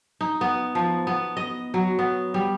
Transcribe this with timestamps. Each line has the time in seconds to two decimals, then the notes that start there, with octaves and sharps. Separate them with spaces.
0.21 D#4
0.41 B3
0.75 F3
1.07 B3
1.37 D#5
1.74 F#3
1.99 B3
2.34 G3